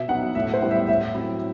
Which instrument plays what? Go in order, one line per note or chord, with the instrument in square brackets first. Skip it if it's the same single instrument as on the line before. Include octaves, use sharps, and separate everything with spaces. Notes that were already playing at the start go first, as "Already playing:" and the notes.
Already playing: [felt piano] B2 [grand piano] E5
[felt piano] F#3 B3 D#4 [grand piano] F#5
[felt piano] A2 [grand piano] E5
[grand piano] C5
[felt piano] G3 B3 E4
[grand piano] E5
[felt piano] A2 [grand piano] E5
[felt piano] F#3 C4 E4